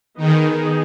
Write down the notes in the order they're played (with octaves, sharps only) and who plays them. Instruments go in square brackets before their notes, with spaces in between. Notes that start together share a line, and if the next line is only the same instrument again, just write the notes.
[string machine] D#3 [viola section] B3 D#4 G#4